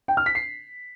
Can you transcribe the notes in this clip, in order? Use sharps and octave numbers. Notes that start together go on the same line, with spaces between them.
G5
F6
B6
C7